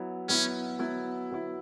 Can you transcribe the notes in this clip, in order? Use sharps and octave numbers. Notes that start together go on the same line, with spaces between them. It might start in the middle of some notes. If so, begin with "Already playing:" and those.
Already playing: F#3 B3 E4
F#3 B3 C#4 E4
F#3 B3 E4
F#3 B3 E4